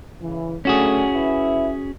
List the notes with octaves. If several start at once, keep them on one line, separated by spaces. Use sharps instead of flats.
C#3 E3
D3 A3 C#4 F#4 G#4
E4 B4 E5